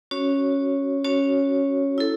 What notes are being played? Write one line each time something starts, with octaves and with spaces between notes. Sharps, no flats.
C#4 F#4 C#5
C#4 F#4 C#5
E4 A4